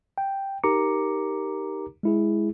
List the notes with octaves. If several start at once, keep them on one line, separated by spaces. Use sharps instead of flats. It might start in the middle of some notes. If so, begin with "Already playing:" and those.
G5
D#4 G4 A#4 A#5 D6 C#7
G#3 E4 G#4